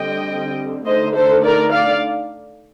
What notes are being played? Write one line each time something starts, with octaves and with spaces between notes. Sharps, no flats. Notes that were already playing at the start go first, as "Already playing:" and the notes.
Already playing: D3 G3 C4 D#5 G5
D3 A3 D#4 C5 D#5
A4 C5
A#4 D5
D5 F5